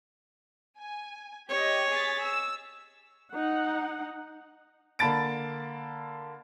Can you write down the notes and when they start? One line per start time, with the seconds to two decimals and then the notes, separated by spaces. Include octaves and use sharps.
0.78 G#5
1.49 G4 C#5 D#5
1.90 G#4 A6 B6
2.23 E6
3.33 D#4 F#5
4.99 D3 A#3 A5 B5 A6 D7